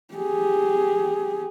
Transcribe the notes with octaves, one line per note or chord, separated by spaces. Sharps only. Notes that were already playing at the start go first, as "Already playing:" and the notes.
G4 G#4